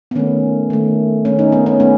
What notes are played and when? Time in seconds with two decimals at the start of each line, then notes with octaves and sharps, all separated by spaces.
0.11 B3
0.15 D#3 A3 C#4
0.70 D#3 A3
1.25 D#3 A3 C#4
1.39 D#4
1.52 B3
1.66 C#4
1.80 A3 B3